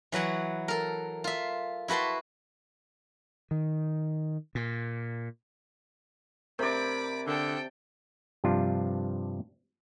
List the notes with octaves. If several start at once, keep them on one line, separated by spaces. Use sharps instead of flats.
E3 F#3 B4 F#5
A4 A#4
F4 E5
E4 F#4 B4 A5 C6
D#3
A#2
C3 A#4 D5 B5 D6
D3 A4 G5
G2 C3 F3 D4 F4